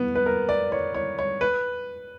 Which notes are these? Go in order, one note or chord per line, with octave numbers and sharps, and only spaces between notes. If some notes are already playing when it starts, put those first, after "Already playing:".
Already playing: B3
B4
A#4
D5
C#5
C#5
C#5
B4